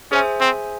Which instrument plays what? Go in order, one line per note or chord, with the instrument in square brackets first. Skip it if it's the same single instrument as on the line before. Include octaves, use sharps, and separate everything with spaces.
[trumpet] C#4 [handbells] G#4 C5 E5 G#5
[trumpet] C4